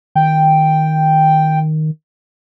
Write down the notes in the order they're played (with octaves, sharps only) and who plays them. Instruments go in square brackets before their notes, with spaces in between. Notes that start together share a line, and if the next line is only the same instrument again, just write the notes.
[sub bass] D#3 [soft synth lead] G5